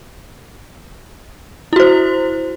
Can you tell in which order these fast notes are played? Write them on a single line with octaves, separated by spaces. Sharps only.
E4 F#4 C5